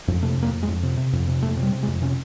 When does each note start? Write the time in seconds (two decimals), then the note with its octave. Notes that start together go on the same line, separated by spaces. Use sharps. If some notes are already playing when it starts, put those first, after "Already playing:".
0.08 F2
0.22 C3 A3
0.37 F2
0.43 A#3
0.53 F2
0.63 G#3
0.68 F2
0.83 C3
0.97 C3
1.13 F2
1.28 C3
1.42 F2 A3
1.57 C3
1.63 G3
1.72 C3
1.83 G#3
1.88 F2
2.02 C3 C#4